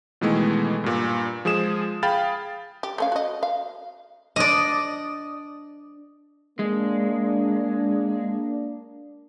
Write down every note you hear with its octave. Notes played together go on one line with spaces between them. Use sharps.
B2 D#3 E3 G#3 A3 B3
G2 A#2
F3 G#3 G#4 D#6 E7
G#4 F5 G5 B5 F6 A6
G4
A3 C#4 F5
F#4 D#5
F5
D4 D5 D#5 D#6
G#3 A#3 D4